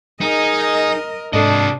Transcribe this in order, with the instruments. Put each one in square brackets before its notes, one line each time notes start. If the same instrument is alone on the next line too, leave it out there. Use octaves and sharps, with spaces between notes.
[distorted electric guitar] D#4 [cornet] G#4 [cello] A#4 D#5
[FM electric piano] G#2 A4 C7 [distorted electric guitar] C3 D#5 [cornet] D4